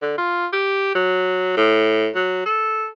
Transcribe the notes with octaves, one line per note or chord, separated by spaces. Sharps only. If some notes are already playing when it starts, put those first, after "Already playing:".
D3
F4
G4
F#3
A2
F#3
A4